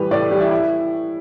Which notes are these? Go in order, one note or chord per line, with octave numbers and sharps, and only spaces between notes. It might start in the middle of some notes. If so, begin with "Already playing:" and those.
Already playing: A2 E3 G3 G4 B4
A2 D5
E3 G3 G4
E4
E4